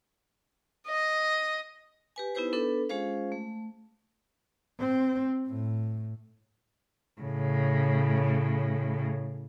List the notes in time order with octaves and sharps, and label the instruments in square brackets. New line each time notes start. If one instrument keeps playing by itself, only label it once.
[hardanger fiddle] D#5
[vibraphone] G4 B4 G#5
B3 D#4 E4 G4 B4 C5
B3 D4 A4 B4
G#3 C#4 F4 G#4 C5 F5
A3
[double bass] C4
A2
[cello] A2 C#3